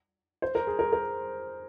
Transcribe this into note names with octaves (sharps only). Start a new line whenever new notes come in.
C5
A#4
G#4
A#4
A#4